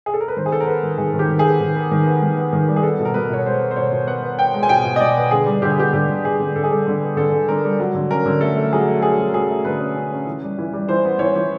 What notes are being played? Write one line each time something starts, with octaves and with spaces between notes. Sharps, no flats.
G#4
A4
A#4
B4
D#3 C5
G#4
B3 A4
A#4
B3 B4
D#3
D#3 G#4
D#3
G4
D#3
G#4
B3
D#3
B3
D#3
B3
D#3
B3
D#3
G3
G#4
B3 A4
B2
A#4
B2 B4
B2 C#5
G#3 C5
B3
C5
B2 C#5
B2
B3 F#5
B3
B3 G5
G#3
G#5
B2 G5
B2
D#5
B2 D5
B3
D3 G#4
G3
D3 G4
G#4
B3 G4
D3 G4
D3
B3 G#4
D3
D3 A4
G#4
G3 A4
D3
B3
D3 A4
D3
D3 A#4
G3
F#3
D3
C#4 A#4
D3
A3 A4
A3
F#3 G#4
A3
F#3 G#4
F#3
F#3 G#4
A3
D3 B4
C#4
C#4
C#4
E3
G3
E3
G3
E3 C5
B3
E3 C#5
E3